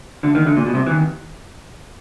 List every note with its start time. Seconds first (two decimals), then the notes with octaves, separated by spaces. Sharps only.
0.23 D2 D3
0.35 D#2 D#3
0.45 D2 D3
0.57 A#2
0.66 B2
0.74 C2 C3
0.87 E3
0.90 D#2 D#3